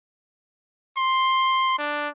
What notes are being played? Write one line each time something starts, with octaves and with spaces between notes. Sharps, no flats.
C6
D4